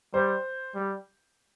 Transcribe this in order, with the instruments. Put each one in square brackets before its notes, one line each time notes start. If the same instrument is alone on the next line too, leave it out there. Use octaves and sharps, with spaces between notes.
[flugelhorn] G3 [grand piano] C5
[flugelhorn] G3